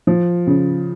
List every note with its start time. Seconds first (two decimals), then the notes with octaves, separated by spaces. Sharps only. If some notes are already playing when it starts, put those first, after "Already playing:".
0.07 F3
0.47 C#3